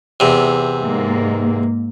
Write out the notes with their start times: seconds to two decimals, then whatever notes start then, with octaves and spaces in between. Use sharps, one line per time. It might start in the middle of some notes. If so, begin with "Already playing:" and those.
0.20 E2 C3
0.82 G#2 A#3